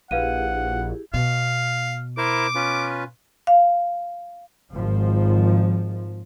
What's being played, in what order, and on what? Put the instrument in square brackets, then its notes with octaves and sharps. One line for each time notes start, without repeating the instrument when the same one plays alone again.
[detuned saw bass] A#1 [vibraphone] E4 G4 G#4 [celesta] B4 F5 D#7 [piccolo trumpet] F#5
[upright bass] B2 [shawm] F5
[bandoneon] E4 A#4 C5 [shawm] D6
[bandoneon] C#4 F4 B4
[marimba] F5
[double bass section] G#1 F3